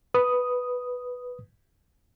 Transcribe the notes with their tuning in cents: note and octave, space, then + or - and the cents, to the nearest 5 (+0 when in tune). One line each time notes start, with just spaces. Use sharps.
B4 +0 D#6 +0